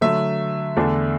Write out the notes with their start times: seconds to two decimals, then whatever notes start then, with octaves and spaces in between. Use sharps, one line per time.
0.01 D3 F#3 A3 E5
0.77 E2 D3 A3 D4